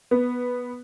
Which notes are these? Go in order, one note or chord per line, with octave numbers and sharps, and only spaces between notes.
B3